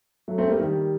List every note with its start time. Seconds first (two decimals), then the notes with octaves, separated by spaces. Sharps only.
0.28 F#3 A3
0.38 A3 C4
0.49 G3 A#3
0.59 D#3 G3